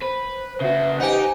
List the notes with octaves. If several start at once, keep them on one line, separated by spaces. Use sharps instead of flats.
B4 C5
C#3 F#4 B4 E5
D#4 G4 C5 F#5 G#5